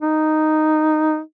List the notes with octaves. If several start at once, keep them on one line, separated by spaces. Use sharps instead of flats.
D#4